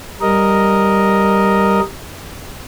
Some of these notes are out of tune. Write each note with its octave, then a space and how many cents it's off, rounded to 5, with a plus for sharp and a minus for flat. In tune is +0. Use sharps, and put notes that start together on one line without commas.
G3 +0 A#4 +0 D#5 +0